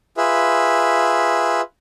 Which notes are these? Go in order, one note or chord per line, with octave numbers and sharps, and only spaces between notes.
F4 G#4 B4 E5